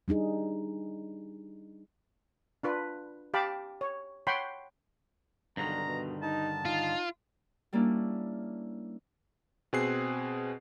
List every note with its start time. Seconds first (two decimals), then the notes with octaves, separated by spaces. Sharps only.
0.08 G3 D4 D#4 G#4
2.63 D4 F4 B4
3.34 G4 F5 A5 B5 D6
3.81 C#5
4.27 C#5 F#5 G5 B5 C6
5.57 B1 G2 D3 D#3 A#5
5.86 B2
6.23 D#4 A5
6.65 D#4 F4
7.73 G3 A#3 C#4 D4 E4
9.73 B2 C4 G#4 F#6 C7